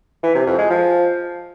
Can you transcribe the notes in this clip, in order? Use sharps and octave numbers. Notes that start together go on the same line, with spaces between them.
E3
C3
F2
G#3
F3